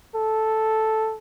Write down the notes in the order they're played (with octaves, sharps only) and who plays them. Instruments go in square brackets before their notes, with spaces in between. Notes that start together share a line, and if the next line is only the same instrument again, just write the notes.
[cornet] A4